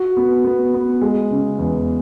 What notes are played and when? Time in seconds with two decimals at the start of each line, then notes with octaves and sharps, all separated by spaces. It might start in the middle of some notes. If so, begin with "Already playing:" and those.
Already playing: F#4
0.17 B3
0.44 B3
0.74 B3
1.01 G#3
1.31 C#3
1.59 E2